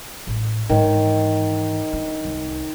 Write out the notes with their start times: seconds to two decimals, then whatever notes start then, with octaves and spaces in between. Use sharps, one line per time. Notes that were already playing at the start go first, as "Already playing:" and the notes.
0.27 A1
0.69 G#2 D#3 E3 C#5
1.93 D4
2.25 C2